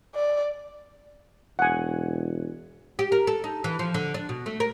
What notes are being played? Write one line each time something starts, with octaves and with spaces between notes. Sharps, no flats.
D5
E1 F#5 G#5
G4
A#4
A4
D#4
E3
F3
D3
D4
B2
A3
A#4